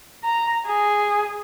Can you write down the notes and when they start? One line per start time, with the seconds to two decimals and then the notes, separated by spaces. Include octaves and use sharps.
0.24 A#5
0.66 G#4